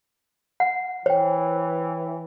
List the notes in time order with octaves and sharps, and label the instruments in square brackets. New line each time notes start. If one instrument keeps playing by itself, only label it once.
[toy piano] F#5
[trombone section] E3 [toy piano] C5 [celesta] C#5 G5